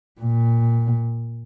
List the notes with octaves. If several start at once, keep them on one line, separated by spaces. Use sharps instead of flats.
A#2